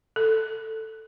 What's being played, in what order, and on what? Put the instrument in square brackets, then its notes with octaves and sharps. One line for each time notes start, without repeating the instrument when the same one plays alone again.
[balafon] A4